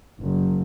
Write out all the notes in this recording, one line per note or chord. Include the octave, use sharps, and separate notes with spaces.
F#1